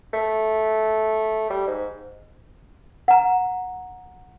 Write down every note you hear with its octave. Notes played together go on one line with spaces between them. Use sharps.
A3
G3
G#2
F#5 A#5